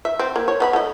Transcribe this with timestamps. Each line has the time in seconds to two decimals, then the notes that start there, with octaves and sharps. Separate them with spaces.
0.05 E5
0.19 C4
0.36 A#3
0.48 C#5
0.60 B3 D#5 B5
0.73 A3 D#5